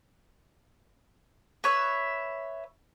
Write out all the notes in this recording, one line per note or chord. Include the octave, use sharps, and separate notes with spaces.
B4 C#5 E5